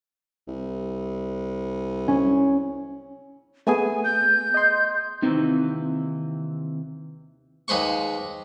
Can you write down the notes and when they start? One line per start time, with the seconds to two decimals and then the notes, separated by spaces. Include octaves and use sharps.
0.48 C2
2.08 C#4
3.67 A3 B3 G#4 G#5
4.04 G6
4.54 D#5 C6
5.22 D#2 C3 D#3 E3 C4 D#4
7.68 D#2 G#3 B4 C5 C#6